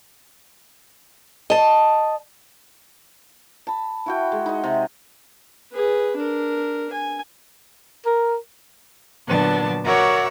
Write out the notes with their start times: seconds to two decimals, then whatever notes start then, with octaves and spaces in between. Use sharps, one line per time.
1.50 D#5 A5
3.67 A5 B5
4.06 E4 F#4 G5
4.32 G#3
4.46 D#4 D#5
4.64 C3
5.72 G#4 B4
6.17 D4 A#4
6.92 G#5
8.06 A#4
9.26 A#2 D3 F#3 B3 D4 A5
9.84 F#4 A#4 C#5 D5 E5 F#5